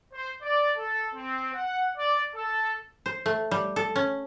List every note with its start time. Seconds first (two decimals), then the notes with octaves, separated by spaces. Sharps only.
0.13 C5
0.42 D5
0.77 A4
1.14 C4
1.54 F#5
1.97 D5
2.34 A4
3.06 C5
3.26 A3
3.51 G3
3.76 A4
3.96 C#4